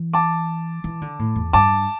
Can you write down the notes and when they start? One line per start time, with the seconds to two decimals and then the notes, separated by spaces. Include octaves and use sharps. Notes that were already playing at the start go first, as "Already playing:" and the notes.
Already playing: E3
0.13 A5 D6
0.84 E3
1.02 D3
1.19 A2
1.36 E2
1.53 G2 A5 D6